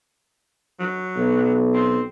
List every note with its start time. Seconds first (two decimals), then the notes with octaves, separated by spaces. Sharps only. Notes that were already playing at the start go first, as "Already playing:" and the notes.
0.80 F#3
1.16 B1
1.74 C4